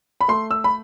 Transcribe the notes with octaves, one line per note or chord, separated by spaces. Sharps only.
B5
A3 C6
E6
B5